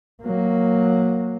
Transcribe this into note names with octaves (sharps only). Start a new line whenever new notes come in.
F#3 A#3